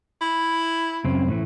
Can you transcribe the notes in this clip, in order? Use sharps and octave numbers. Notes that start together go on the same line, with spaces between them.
E4
F#2 C#3 C4
A2 E3 A3